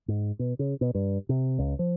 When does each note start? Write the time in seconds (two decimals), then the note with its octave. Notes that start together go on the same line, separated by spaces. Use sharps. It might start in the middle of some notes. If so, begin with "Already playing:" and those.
0.08 G#2
0.39 B2
0.59 C#3
0.81 B2
0.95 G2
1.29 C3
1.59 C#2
1.79 F3